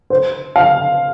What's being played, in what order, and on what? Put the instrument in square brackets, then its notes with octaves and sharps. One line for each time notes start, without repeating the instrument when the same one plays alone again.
[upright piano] C5
F5